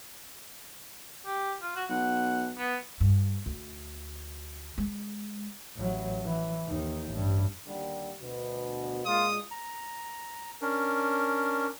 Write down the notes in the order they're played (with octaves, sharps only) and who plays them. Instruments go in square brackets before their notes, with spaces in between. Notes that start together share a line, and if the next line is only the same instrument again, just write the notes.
[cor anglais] G4
F4
F#4
[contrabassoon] B1 [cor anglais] F#5
[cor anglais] B3
[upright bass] G2
D2
G#3
[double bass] A1 F#3
E3
D#2 D#4
A1 G2
[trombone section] D#2 D3 G3
D2 B2
[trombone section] A#2 G#3 [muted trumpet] F4 [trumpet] D#6
[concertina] A#5
C#4 D4 A#4